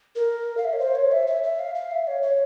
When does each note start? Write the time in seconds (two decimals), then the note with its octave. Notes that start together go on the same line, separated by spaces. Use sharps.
0.16 A#4
0.57 F5
0.64 E5
0.73 C#5
0.79 C5
0.95 C#5
1.12 E5
1.27 E5
1.44 E5
1.59 F5
1.75 F5
1.91 E5
2.07 C#5
2.23 C#5